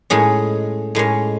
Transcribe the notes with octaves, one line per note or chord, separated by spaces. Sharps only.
A2 G#3 C#4 G#4
A2 G#3 C#4